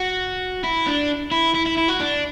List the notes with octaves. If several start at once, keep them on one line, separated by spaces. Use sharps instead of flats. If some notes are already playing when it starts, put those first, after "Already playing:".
Already playing: F#4
E4
D4
E4
E4
E4
E4
F#4
D4